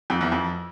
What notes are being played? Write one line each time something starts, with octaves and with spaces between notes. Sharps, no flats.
F2
E2
F2